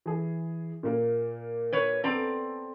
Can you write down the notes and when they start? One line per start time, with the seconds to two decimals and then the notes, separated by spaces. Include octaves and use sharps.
0.06 E3 G#4
0.83 A#2 A#3
1.73 B4 C#5
2.04 B3 C4 A4 D5 A#5